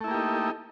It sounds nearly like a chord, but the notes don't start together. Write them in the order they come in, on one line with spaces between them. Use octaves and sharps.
A3 E4 A#3 G4 D#4